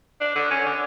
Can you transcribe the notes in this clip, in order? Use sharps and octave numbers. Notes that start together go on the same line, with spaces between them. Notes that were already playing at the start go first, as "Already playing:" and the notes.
D4
D3
C#4
D3